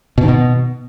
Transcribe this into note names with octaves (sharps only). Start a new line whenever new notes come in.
B2
D#3
B2